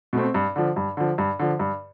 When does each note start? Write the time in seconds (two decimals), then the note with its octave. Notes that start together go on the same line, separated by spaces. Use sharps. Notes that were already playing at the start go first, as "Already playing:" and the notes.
0.13 B2 A3 C4
0.34 G2
0.56 D3 F3
0.76 G2
0.97 D3 F3
1.18 G2
1.39 D3 F3
1.60 G2